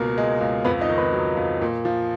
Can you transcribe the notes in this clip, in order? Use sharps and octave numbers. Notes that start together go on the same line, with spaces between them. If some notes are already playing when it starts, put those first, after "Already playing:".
Already playing: C#2 B2 A#3 A#4
G#3
C#2
F2 B3 B4
D#4 D#5
D#3
B3 B4
F#3
F2
A#2
F3